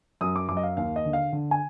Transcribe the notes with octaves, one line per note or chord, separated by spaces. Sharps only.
F#2 D#6
D6
F#2 D6
D#5
F5
D#2 F5
D#5
D3
F5
D3
G#5